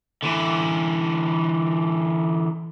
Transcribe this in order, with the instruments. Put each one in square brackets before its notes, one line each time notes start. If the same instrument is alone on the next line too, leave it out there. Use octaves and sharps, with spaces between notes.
[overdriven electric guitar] D3 E3